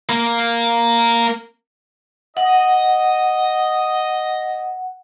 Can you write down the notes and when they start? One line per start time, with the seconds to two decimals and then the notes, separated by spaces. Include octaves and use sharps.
0.09 A#3
2.37 D#5 F#5